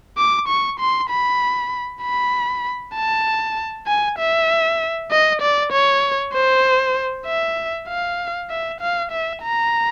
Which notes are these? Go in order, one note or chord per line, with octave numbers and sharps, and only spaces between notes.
D6
C#6
C6
B5
B5
A5
G#5
E5
D#5
D5
C#5
C5
E5
F5
E5
F5
E5
A#5